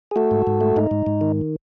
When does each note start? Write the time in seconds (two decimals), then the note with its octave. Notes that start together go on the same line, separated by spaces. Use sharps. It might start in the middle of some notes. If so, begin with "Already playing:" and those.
0.11 G#4
0.16 A3 F#4 A4
0.31 G#2
0.47 G#2
0.61 A3
0.76 G#2 D#4
0.91 G#2
1.06 G#2
1.21 D#3